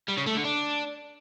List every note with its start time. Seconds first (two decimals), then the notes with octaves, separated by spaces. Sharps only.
0.09 G3
0.18 C#3
0.27 A3
0.36 D3
0.45 D4